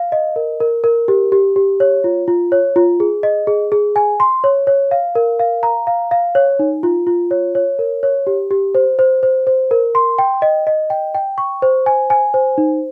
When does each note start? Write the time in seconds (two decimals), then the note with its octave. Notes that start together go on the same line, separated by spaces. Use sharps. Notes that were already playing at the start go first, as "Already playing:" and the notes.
Already playing: F5
0.12 D#5
0.36 A#4
0.60 A#4
0.84 A#4
1.08 G4
1.32 G4
1.56 G4
1.80 C#5
2.04 F4
2.28 F4
2.52 C#5
2.76 F4
3.00 G#4
3.23 D#5
3.47 G#4
3.72 G#4
3.96 G#5
4.20 C6
4.44 C#5
4.67 C#5
4.91 F5
5.15 A#4
5.40 F5
5.63 A#5
5.87 F5
6.11 F5
6.35 C#5
6.59 D#4
6.83 F4
7.07 F4
7.31 C#5
7.55 C#5
7.79 A#4
8.03 C#5
8.27 G4
8.51 G4
8.75 C5
8.99 C5
9.23 C5
9.47 C5
9.71 A#4
9.95 C6
10.19 G5
10.42 D#5
10.67 D#5
10.90 G5
11.15 G5
11.38 C#6
11.62 C5
11.86 G#5
12.10 G#5
12.34 C5
12.58 D#4